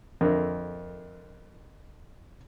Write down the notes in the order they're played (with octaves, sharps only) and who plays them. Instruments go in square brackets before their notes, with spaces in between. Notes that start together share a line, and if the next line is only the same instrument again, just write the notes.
[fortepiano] F2 D3 [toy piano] A#4 C5 E5